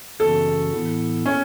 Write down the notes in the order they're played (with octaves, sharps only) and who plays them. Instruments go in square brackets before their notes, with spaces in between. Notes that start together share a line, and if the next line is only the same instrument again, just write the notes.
[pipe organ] F#2 C#3 E3 C#4 F#4 [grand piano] A4
[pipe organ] A2 E3 B3 E4
[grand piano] C#4